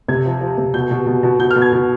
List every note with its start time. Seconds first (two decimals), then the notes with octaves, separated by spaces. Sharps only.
0.08 C3 G#6
0.26 F3
0.41 F3
0.58 C3
0.74 B2 G6
0.91 B2
1.07 B2
1.23 B2
1.39 B2 G6
1.51 F6
1.56 B2
1.62 G#6
1.73 B2